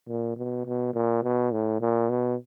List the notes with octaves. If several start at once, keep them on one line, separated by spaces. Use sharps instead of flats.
A#2
B2
B2
A#2
B2
A2
A#2
B2